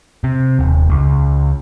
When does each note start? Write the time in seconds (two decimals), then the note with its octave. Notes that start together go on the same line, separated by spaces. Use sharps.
0.24 C3
0.59 D#1
0.90 C#2